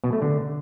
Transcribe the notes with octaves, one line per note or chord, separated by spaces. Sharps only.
B2
A3
D3